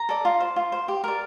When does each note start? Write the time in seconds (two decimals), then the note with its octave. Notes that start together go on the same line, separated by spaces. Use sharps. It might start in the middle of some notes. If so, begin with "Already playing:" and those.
Already playing: A#5
0.09 A4 D5
0.25 F4
0.40 C5
0.56 F4
0.72 C5
0.88 G4
1.04 A#4 D5